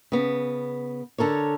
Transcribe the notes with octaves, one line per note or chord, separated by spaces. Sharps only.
C#3 B3
D3 A4 A#4 C#5